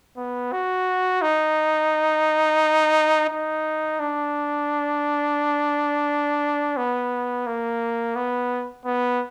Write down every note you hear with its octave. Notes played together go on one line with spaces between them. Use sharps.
B3
F#4
D#4
D#4
D4
B3
A#3
B3
B3